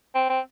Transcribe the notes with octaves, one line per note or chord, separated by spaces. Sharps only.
C4
C4